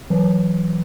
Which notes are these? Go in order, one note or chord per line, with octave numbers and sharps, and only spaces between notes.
E3 F#3